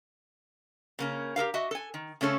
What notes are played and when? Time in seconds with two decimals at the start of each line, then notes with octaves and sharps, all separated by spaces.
0.99 C#3 A#3 C#4
1.36 G4 A4 A#4 F5
1.54 F#4 D#5 E5
1.71 A4 G#5
1.94 D#3
2.21 C#3 A3 C#4 A4